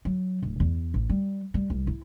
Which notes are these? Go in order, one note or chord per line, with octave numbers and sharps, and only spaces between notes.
F#3
D1
E2
A1
G3
G3
C2
E4